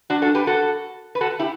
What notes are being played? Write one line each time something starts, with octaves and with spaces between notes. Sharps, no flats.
D4 F#4
F#4 A4
G4 B4
F#4 A4
B4
F#4 A4
E4 G4